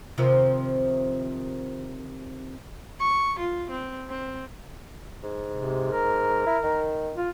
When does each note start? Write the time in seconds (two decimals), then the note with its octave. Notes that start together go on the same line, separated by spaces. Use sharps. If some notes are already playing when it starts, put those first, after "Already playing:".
0.18 C3 D#3 F3
3.00 C#6
3.39 F4
3.71 C4
4.10 C4
5.23 G#2
5.54 C3
5.91 A#4
6.46 E4
6.64 D#3
7.17 F4